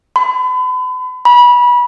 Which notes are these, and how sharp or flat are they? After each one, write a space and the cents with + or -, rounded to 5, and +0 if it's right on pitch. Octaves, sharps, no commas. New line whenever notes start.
B5 +40
B5 -25